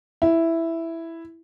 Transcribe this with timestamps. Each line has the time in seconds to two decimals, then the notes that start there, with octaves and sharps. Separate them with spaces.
0.22 E4